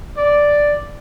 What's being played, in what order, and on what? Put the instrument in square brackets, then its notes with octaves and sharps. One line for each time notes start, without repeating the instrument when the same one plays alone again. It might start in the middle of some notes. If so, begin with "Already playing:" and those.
[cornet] D5